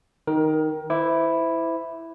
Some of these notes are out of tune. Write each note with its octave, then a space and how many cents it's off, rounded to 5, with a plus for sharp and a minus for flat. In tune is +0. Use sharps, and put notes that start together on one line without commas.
D#3 +0 A#4 +25
E4 +0 C5 -35 D6 +0